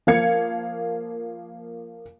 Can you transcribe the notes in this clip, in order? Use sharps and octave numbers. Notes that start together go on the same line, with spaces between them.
F3 A#3 F5 G#6 C#7